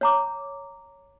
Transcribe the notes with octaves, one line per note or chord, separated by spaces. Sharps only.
C#5 A#5 D6